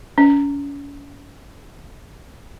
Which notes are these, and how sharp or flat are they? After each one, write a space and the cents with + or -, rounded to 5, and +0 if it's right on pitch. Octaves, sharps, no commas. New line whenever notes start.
C#4 +35